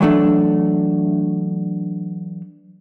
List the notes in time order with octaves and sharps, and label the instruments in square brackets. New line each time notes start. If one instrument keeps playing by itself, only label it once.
[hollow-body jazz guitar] E3 F#3 A3 D4